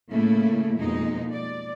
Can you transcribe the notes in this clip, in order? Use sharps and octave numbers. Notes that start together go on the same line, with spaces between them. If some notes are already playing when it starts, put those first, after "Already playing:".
A2 C#3 A3 A#3 E4
F2 B2 G#3 A#3 D#4
D5